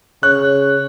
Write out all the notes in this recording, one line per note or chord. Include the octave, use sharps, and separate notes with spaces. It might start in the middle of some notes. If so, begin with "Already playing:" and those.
C#3 C#5 F#6